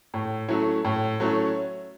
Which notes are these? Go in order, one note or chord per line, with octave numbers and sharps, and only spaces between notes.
A2
F#3 A3 C#4 E4
A2
F#3 A3 C#4 E4